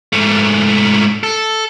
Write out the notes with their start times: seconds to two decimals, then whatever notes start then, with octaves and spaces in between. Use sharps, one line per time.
0.13 G#2 A3
1.23 A4